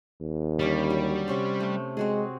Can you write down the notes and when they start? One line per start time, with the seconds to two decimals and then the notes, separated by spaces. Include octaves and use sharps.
0.22 D#2
0.59 D3 G3 C#4 B5
0.90 F#3
1.28 C3 C#4 C5
1.60 A3
1.97 G#3 C4 F#4 G#4